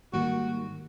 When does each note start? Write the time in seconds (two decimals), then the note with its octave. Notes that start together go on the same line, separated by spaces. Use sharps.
0.13 G#2 D#3 G3 A#3 F#4